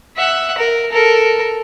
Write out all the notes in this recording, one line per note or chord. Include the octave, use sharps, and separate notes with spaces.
E5 F#5
A#4
A4 A#4